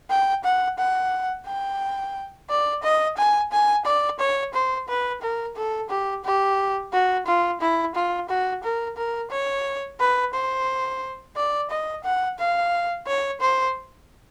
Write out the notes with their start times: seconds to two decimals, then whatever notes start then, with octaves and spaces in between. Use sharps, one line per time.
0.10 G5
0.44 F#5
0.78 F#5
1.46 G5
2.50 D5
2.83 D#5
3.17 G#5
3.52 G#5
3.85 D5
4.19 C#5
4.54 C5
4.88 B4
5.22 A#4
5.56 A4
5.90 G4
6.25 G4
6.93 F#4
7.27 F4
7.61 E4
7.95 F4
8.29 F#4
8.63 A#4
8.97 A#4
9.31 C#5
10.00 B4
10.34 C5
11.36 D5
11.71 D#5
12.04 F#5
12.39 F5
13.07 C#5
13.41 C5